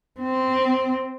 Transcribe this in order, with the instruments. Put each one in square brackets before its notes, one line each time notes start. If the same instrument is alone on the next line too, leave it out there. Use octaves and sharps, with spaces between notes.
[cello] C4